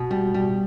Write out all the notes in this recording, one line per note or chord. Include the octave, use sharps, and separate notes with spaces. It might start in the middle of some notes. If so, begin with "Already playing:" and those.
Already playing: B2
G3
G3